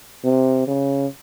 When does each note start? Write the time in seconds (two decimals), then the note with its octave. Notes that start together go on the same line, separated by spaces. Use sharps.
0.24 C3
0.67 C#3